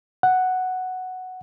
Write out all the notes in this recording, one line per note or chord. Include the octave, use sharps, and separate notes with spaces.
F#5